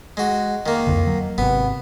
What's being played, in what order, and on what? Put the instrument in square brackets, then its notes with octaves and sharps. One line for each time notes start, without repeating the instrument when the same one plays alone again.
[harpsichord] G#3 F#4
D#3 A#3
[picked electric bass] C2 F2 D3
F#3
[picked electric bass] G#1 C3 [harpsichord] B3